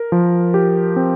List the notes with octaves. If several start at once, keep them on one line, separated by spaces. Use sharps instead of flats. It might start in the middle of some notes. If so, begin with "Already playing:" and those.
Already playing: A#4
F3
G4
C4